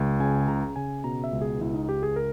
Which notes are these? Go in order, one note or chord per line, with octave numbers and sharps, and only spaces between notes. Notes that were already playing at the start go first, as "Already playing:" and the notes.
Already playing: C#2
C#3 G#5
C#3 A#5
C#3 G#5
B2 A#5
E5
C#2
G#4
C#2 E4
D#4
C#2 G4
G#4
A#4